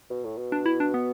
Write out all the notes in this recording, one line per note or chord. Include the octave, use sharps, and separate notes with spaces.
B2
A2
B2
D4
E4
D4
B3